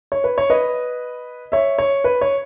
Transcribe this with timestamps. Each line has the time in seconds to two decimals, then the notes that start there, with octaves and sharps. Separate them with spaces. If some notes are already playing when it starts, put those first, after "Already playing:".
0.12 C#5
0.24 B4
0.38 C#5
0.50 B4 D#5
1.52 C#5 E5
1.79 C#5
2.04 B4
2.21 C#5